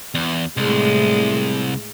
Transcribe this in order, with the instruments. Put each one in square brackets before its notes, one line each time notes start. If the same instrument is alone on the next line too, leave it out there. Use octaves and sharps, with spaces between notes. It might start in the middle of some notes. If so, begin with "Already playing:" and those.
[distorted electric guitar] E2
[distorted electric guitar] C2 [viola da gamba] A2 G#3